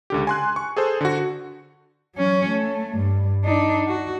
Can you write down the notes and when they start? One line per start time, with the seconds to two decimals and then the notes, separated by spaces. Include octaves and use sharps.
0.10 C#2 D3 G4
0.27 G#5 C6 F#6
0.56 C#6
0.77 G#4 A4 C5
1.01 D3 F#4
2.16 F#3 C#4
2.49 A3
2.97 G2
3.45 D4 D#4
3.88 F#4